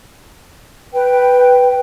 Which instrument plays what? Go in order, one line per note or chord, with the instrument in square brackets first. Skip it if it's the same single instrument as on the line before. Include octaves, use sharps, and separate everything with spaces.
[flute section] B4 G5